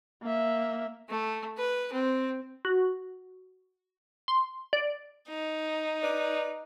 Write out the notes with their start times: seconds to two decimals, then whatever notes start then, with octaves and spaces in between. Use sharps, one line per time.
0.23 A#3 E5
1.08 A3
1.57 B4
1.92 C4
2.65 F#4
4.28 C6
4.73 D5
5.29 D#4
6.03 B4 D5